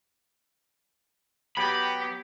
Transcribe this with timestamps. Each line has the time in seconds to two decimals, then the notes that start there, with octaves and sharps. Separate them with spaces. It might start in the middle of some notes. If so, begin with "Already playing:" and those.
1.57 F#3 B3 G4 B5